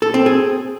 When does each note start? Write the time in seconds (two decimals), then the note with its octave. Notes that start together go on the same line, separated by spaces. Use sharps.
0.02 A4
0.14 C4
0.26 G#4